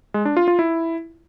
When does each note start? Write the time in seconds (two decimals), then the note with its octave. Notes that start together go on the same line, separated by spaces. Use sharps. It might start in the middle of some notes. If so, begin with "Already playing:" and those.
0.14 G#3
0.25 D4
0.37 F4
0.48 F4
0.59 E4